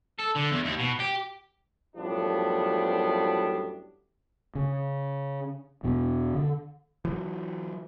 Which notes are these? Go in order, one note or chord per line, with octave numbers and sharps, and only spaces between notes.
A4
D3
E2
D#2
B2
G4
F#2 A2 F3 G3 B3 D4
C#3
E2 B2 B3
D3
E3 F#3